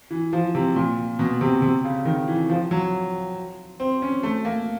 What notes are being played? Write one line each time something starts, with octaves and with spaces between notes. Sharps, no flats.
E3
F3
C3
A#2
B2
C3
C3
C#3
D#3
E3
F3
F#3
C4
C#4
A3
A#3